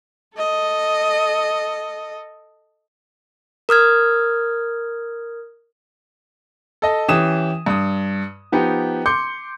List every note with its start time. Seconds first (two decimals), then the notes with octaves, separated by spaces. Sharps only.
0.37 A4 D#5
3.69 A#4 D#6 F6 G#6
6.82 A4 D#5
7.08 E3 C#4 G4 D#6 E7
7.66 G2 D#6
8.52 F3 B3 D#4 G4
9.06 C6 D6 G6 C#7